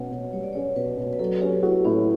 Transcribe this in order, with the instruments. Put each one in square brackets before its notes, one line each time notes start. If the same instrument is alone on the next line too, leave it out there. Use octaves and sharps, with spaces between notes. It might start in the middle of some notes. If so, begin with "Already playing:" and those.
Already playing: [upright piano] B2 C#4 [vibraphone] B4 C#5 F#5
[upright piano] B2
[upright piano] G3 [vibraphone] C#5
[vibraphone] D5
[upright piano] C#4 [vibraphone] C#5
[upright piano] B2 [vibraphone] B4
[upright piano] B2
[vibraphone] B4
[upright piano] F#3 [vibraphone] A4
[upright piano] C#4 [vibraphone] G4
[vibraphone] E4 [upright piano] F#4
[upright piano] A2 [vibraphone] C#4